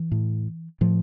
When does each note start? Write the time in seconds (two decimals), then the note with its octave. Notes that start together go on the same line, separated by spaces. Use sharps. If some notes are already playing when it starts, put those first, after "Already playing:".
Already playing: E3
0.12 A2
0.81 A2 F3